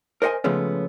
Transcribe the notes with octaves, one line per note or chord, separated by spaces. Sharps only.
A#4 C5 D#5 F#5 G#5
C#3 F3 G#3 A3 B3 C#4